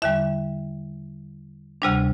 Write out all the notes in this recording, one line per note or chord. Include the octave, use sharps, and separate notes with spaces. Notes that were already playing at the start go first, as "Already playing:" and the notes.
E2 D3 G3 E5
D2 C3 G3 D4